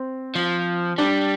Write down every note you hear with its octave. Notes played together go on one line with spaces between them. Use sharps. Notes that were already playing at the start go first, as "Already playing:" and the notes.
Already playing: C4
F3
G3 D4